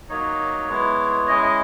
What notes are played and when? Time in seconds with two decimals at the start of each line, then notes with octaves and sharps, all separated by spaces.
0.09 F#3 A#3 D#4 C#5
0.69 G#3 B3 E4
1.28 G#3 C#4 E4 D#5
1.43 D#5